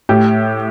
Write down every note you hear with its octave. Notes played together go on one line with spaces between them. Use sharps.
A2 G4